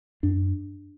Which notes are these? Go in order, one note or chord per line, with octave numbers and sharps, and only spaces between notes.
F#2 D4